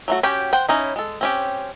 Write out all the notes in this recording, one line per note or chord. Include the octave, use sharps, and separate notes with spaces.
F#3 A3 F#4
C#4 F#4 G4 G5
C5 F#5 G5
C#4 D#4 E4
G#3 A4
C4 C#4 G4